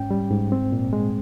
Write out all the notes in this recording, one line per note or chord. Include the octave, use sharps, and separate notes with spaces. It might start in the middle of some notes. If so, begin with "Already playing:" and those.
Already playing: G#2 C#4 G5
G3
G#2
C4
A#2
G#3